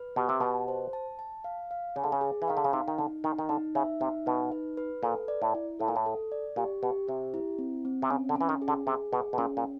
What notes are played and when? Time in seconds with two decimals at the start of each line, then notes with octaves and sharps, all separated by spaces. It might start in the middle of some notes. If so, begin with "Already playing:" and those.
Already playing: B4
0.16 B2 G4
0.29 C3
0.40 B2 A5
0.68 C5
0.93 A5
1.19 A5
1.44 F5
1.71 F5
1.96 C#3 G#4
2.04 D3
2.12 C#3
2.21 G#4
2.42 E3
2.48 D#3 F5
2.57 D3
2.64 C#3
2.73 C3 D#4
2.88 D#3
2.98 D3 D#4
3.24 D#3 D#4
3.38 D#3
3.49 D3 D#4
3.75 C#3 E5
4.00 C3 D#4
4.26 B2 D#4
4.52 B4
4.77 B4
5.03 A#2 A4
5.28 D5
5.42 A2
5.55 E4
5.79 A2 A4
5.88 A#2
5.96 A2
6.06 A4
6.32 D5
6.56 A#2 G4
6.83 B2 G4
7.08 C3 G4
7.34 E4
7.59 C4
7.85 C4
8.02 C3
8.10 C#3 C#4
8.29 D3
8.36 C#4
8.41 E3
8.49 D#3
8.62 G#4
8.68 D3
8.87 C3 G#4
9.13 B2 G#4
9.33 B2
9.38 A#2 C#4
9.57 A#2